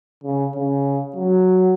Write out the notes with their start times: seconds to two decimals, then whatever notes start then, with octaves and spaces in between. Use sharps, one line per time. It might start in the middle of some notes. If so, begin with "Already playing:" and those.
0.24 C#3
0.55 C#3
1.16 F#3